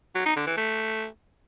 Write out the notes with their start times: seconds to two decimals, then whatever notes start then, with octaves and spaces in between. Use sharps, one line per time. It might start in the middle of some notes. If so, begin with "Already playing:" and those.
0.15 F#3
0.26 D#4
0.36 D3
0.47 E3
0.57 A3